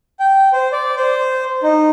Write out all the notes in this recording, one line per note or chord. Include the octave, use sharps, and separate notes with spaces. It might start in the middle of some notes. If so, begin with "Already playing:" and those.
G5
C5
D5
C5
D#4